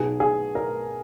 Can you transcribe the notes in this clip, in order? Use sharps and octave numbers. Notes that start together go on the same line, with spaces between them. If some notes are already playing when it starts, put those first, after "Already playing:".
Already playing: B1 B2 G#4
G#4
A#4